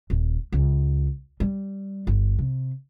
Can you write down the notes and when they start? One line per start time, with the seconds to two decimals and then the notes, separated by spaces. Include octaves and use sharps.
0.10 D#1
0.52 C#2
1.40 G3
2.07 G1
2.39 C3